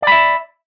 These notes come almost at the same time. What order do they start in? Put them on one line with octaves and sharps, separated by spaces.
D5 B5 E5